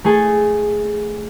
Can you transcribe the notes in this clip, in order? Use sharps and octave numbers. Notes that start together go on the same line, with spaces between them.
A3 G#4 A4